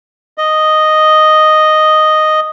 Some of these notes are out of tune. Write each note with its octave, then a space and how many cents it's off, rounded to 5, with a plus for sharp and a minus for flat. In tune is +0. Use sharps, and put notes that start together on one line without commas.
D#5 -5